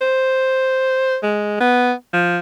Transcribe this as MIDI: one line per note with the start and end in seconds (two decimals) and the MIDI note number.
0.01 1.17 72
1.23 1.56 56
1.60 1.93 59
2.13 2.39 53